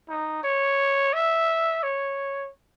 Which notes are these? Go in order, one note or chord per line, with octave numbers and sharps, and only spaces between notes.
D#4
C#5
E5
C#5